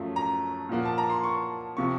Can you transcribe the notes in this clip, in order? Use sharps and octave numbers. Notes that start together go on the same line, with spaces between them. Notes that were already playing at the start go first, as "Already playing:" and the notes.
Already playing: F#2 F3 A3
A#5
A#2 F3 A#3 F#5
A5
A#5
C6
C#6
C3 F3 C#6